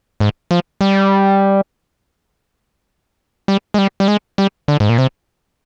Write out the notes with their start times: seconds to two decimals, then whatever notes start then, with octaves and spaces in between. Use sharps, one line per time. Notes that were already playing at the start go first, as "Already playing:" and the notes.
0.20 G#2
0.51 F3
0.81 G3
3.48 G3
3.74 G#3
3.78 G3
4.00 G3
4.08 G#3
4.38 G3
4.68 D3
4.80 G#2
4.89 A#2
4.98 C3